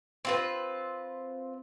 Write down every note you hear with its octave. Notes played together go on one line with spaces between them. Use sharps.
C4 F4 B4